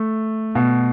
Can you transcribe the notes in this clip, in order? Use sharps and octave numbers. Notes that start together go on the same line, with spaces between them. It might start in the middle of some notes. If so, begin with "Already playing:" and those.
Already playing: A3
B2